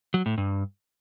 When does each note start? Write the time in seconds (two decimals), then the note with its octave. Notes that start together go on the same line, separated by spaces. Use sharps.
0.14 F#3
0.26 A2
0.38 G2